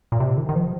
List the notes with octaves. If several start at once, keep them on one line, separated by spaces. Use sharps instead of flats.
A#2
C3
D#3
D#3
F3